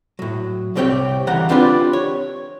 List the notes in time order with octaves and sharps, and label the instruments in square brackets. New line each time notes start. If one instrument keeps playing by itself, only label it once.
[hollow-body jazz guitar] A2 F#3
C2 G3 C4 G4 C#5 G5
D2 C#3 E3 G3 F#5 A#5
C4 D4 F4 G4 B4 D5
C#5